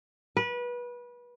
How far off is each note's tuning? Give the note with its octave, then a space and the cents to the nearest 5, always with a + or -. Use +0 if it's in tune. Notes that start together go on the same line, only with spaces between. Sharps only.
B4 -25